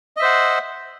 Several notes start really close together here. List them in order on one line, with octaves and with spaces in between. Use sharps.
D#5 E5 C5 F#5